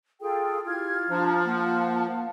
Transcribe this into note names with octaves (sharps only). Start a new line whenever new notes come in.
F4 G#4 A4 G5
E4 F4 G4 F6 G#6
F3 D4 C5 A5 A#5
A#3 F5 F#5 A5